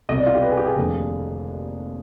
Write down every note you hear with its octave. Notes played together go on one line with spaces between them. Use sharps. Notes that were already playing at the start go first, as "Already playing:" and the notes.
C2 B2 D#5
D5
F4
G4
B4
G#4
G4
G#4
F1 D#2 D3 F3